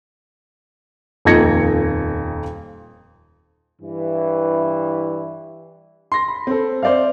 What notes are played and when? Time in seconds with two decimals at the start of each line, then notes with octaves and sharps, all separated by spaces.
1.25 D#1 F2 D#4 G#6 A#6 C#7
3.82 G2 E3
6.12 C6 A#6
6.28 B5
6.47 C4 A4
6.82 C5 D5 E5 F5